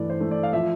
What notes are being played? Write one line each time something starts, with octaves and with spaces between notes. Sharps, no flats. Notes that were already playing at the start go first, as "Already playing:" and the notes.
Already playing: G2 E3 A3 D5
C5
A3
D5
F5
F3 E5